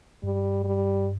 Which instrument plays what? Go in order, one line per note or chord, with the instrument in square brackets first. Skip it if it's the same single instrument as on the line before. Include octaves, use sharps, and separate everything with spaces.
[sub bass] G2 [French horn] G3
[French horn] G3